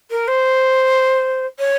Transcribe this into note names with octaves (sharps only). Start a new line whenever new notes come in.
A#4
C5
C#5